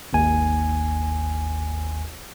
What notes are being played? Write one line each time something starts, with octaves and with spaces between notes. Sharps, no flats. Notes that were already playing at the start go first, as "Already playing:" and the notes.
G#1 D#2 G#5